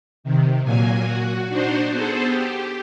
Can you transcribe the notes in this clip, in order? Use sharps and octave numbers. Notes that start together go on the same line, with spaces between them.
C3 D#3
A#2 F#3 A#3 G#5
F#4
D4 D#4 F#4 C5
B3 G#4 A4 C5
G4